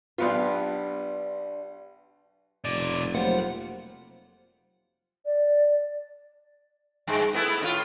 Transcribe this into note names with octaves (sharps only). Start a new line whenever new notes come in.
B1 B3 D4 F4 G4 B4
F1 B2 D5
F#3 G3 A3 A#3 F4 C5 F#5
D5
G2 G#3
A3 B3 E4
A2 D#4 F4